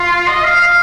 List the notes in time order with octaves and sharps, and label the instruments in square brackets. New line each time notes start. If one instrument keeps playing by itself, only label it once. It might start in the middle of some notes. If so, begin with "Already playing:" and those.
Already playing: [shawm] F4
D#5
F5
F5